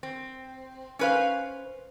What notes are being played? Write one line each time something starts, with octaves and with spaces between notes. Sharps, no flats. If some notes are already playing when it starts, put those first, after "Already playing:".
C4
C#4 D4 B4 C5 F5